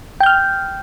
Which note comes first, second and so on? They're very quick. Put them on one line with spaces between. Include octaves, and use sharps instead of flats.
G5 G6 F6